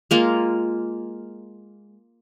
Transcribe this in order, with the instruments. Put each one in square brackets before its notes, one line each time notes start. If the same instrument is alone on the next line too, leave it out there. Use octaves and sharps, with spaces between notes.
[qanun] G#3 A#3 F4